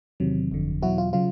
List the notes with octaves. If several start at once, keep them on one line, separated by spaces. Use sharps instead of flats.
E2 C3 D#3 F#3
G1 F2 D3
E2 B2 F#3 E4 F#4
F4
C#3 F#3 F4